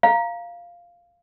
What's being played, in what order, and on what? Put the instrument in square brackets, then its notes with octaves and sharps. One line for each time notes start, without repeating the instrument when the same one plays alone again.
[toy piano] F5 [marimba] A#5